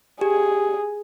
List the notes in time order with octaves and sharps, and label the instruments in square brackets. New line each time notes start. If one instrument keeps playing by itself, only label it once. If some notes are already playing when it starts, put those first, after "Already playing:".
[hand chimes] G4 [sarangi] G#4